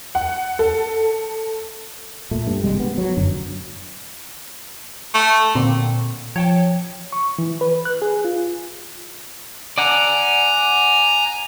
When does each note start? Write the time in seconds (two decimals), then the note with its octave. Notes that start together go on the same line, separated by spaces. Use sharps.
0.15 F#5
0.59 A4
2.31 A#2 A3
2.47 G2
2.63 G#1 C3 G3 G#3
2.79 B3
2.98 F#3
3.17 F1 F#2 D3
5.14 A3
5.55 A#2 D3 A#3 C4
6.36 F3 C#5 G5 A5
7.13 C#6
7.39 E3
7.61 B4
7.85 F#6
8.02 G#4
8.25 F4
9.78 D5 F#5 G#5 A#5